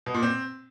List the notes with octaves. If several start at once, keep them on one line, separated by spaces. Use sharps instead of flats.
B2
A#2
C4